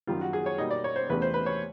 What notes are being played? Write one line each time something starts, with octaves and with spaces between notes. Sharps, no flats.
F#2 D#3 G3 F4
F#4
G#4
C#5
B2 G3 A#3 D#4 D#5
D5
C#5
C5
E2 C3 E3 A3 C#4 B4
C5
B4
C#5